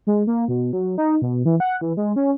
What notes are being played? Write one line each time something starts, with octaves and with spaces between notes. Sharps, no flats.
G#3
A#3
B2
F#3
D#4
B2
E3
F#5
E3
G#3
C#4